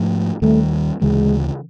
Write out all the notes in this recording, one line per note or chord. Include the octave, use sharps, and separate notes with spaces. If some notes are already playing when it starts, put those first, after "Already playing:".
Already playing: G#2 F3 A3
D#2 D#3 G3 A3
D2 C#3 E3 G#3